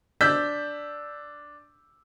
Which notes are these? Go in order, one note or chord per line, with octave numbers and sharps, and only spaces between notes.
D4 E6 G6 B6